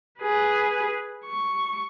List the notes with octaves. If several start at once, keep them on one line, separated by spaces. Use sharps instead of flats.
G#4 B4
C#6